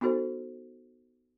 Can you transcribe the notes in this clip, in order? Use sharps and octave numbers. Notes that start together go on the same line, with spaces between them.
B3 D#4 F#4 A4 C5